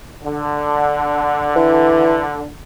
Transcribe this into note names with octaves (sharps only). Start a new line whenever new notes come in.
D3
E3